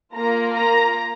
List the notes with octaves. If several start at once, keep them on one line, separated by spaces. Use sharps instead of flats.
A#3 F4 A#5
A#5